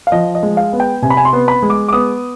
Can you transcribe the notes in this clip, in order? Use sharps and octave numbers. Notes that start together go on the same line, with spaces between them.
F5
F3 D#5
D#5
G#3
F5
B3
G5
C3 G#5
B5
G#5
C6
B3
B5
G#3
D6
D6
B3 D#6